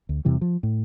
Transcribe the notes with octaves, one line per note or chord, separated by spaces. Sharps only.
D2
E2 C3 E3 G3
F3
A2